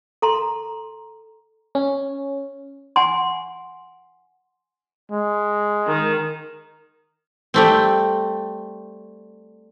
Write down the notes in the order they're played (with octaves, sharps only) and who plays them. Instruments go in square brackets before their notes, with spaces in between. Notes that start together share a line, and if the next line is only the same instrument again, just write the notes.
[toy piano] A4 A#5 C6
[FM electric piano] C#4
[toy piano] F#5 G#5 C6
[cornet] G#3
[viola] D#3
[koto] G3 A3 C4